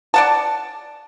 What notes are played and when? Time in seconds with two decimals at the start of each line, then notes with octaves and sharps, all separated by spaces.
0.14 D5 F#5 A5